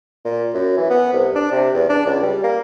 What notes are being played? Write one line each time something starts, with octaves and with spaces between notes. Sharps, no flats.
A#2
F#2
E3
B3
C2
D4
C3
E2
D4
C#2
G3
A#3